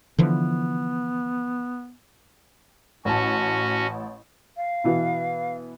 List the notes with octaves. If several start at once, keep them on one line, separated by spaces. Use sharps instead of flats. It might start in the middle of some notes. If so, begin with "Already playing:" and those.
D3 E3 F3 B3
A1 C#4 F#4 A5
F5
B2 E3 B3